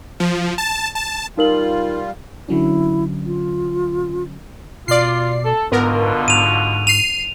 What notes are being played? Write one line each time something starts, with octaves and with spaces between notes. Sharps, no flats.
F3
A5
A5
G3 D#4 F4 A#4 F#7
D3 F#3 C#4 E4
F4
B2 F4 D5 C7
A4
G#2 B2 D3 B3 F4 A#4
G#2 D#7 F7
C7 D#7 F7